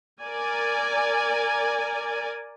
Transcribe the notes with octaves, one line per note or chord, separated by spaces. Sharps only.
A#4 D5 G#5